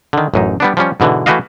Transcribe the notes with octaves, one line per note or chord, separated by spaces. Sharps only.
D3 D#3
A1 F#2 D#4
G3 B3 D4
F3 G3 C#4
G#2 B2 D3 E3
E3 A3 E4 F#4 D#5 F5